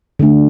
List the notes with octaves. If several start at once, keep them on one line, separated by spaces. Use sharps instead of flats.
D3 A3 D4